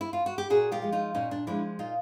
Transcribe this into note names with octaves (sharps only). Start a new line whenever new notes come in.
E4
F4
F#4
G4
A#2 F#4 G#4
F4 G4
F3 G#3
D#4 F4
A#2 C#4 D#4
D4
F3 G#3 D4 E4
A#2 D#4 F4